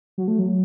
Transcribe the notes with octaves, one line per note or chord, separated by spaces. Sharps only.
F#3
A3
F#3